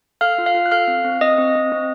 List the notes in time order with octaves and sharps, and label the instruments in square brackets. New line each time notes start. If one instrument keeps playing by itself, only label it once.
[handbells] A4 F5 F6
F4
F5 F6
F4
F#6
A4 F5 F6
C4
C4
C4 D#5 D#6
C4
C4
C4